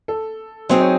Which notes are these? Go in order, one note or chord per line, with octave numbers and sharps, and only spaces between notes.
A4
F#3 C4 D#4 G#4 C5
C#5